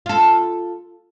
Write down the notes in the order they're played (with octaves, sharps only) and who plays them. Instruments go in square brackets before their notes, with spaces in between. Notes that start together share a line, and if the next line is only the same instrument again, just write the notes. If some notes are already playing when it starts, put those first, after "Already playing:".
[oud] F4 A4